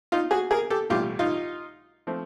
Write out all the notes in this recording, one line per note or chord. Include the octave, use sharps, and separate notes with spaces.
D#4 F4
F#4 G#4
G#4 A#4
G4 A4
B1 A2 E3 G3 F4 G4
D#4 F4
F3 A3 C4